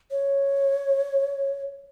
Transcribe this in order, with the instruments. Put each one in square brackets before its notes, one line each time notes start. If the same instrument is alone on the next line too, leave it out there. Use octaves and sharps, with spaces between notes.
[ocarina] C#5